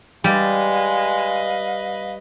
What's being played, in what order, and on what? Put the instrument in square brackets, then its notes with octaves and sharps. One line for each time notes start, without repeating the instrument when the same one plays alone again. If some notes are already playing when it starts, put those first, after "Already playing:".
[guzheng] G3 [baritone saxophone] G#3 [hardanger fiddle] B4 D#5 [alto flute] F5